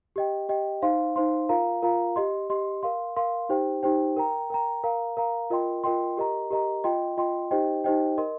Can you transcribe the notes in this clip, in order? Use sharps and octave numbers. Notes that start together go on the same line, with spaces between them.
G4 D#5 G5
G4 D#5 G5
D#4 C5 F5 C6
D#4 C5 F5 C6
F4 A#4 F5 A#5
F4 A#4 F5 A#5
G4 D#5 C6
G4 D#5 C6
A#4 F5 C6
A#4 F5 C6
D#4 G4 C5 G5
D#4 G4 C5 G5
A#4 G5 A#5
A#4 G5 A#5
A#4 F5 A#5
A#4 F5 A#5
F4 A#4 D#5 G5 C6
F4 A#4 D#5 G5 C6
G4 A#4 D#5 A#5
G4 A#4 D#5 A#5
F4 D#5 G5 C6
F4 D#5 G5 C6
D#4 G4 C5 D#5 G5
D#4 G4 C5 D#5 G5
A#4 D#5 C6